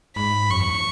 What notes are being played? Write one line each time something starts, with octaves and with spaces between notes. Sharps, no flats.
G#2 B5
F#2 C#6
E2